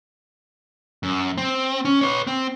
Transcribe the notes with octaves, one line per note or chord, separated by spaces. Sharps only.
F#2
C4
C#4
B4 C#5
C4